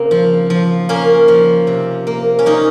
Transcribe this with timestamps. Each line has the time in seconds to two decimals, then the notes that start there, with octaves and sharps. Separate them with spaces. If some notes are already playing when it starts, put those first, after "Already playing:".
Already playing: C#3 A#3 C4
0.11 F3
0.50 F3
0.89 A#3 C#4
1.28 F3
1.67 C3
2.07 A#3
2.39 C#4
2.46 A#3 D#4